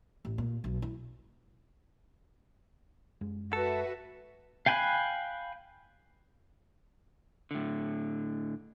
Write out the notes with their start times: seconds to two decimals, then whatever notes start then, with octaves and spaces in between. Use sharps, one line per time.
0.25 A1
0.38 A#2
0.64 B1
0.82 E4
3.21 F#2 G#3
3.53 F#4 A4 B4 E5
4.66 F5 G5 G#5 B5 F#6
7.51 A2 D3